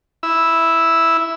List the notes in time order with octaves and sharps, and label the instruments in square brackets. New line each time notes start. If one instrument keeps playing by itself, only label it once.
[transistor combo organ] E4 E6